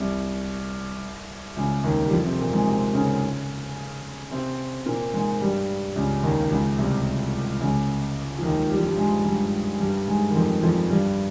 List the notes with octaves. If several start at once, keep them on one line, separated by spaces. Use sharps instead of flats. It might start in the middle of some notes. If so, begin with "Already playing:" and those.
Already playing: C2 C3
C#2 C#3
D#2 D#3
G3
F2 F3
C3 C4
A#2 A#3
G#2 G#3
C3 C4
C#3 C#4
C3 C4
A#2 A#3
G#2 G#3
G2 G3
C#2 C#3
D#2 D#3
C#2 C#3
C2 C3
C#2 C#3
F3
D#2 D#3
G3
F3
G2 G3
G#2 G#3
G2 G3
G2 G3
G#2 G#3
D#3
F2 F3
F2 F3
G2 G3